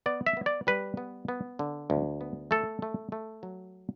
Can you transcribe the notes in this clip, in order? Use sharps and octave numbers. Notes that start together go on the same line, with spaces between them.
B3 D5
E5
B3
D5
G3 B4
B3
B3
D3
D2
B3
A3 A4
A3
A3
F#3